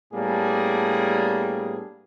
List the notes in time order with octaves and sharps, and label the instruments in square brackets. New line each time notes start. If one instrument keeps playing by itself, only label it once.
[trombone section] A2 G3 A#3 B3 D4 G#4